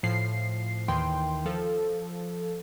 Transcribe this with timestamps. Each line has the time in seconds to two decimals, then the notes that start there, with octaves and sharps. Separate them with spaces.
0.03 A2 F3 C7
0.88 D#2 D#3 E3 G5 C6
1.45 F3 A4